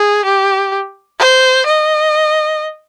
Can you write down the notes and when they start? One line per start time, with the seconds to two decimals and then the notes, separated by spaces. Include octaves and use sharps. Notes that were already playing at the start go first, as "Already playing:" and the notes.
Already playing: G#4
0.25 G4
1.19 C5
1.66 D#5